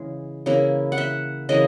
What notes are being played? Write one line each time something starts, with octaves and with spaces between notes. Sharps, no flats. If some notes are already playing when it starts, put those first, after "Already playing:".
Already playing: C#3 E3 G#3
C#3 E3 A#3 E4
F#5
E5
C#3 E3 A#3 D#5